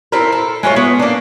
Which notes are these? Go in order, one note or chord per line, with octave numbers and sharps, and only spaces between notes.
C4 E4 A4 A#4
A4
G#3 A3 F4 C#5
B3
A#3 D4